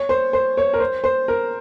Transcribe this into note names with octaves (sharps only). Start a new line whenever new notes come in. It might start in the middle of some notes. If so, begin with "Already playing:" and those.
Already playing: C#5
C5
C5
C#5
A#4
C5
C5
A#4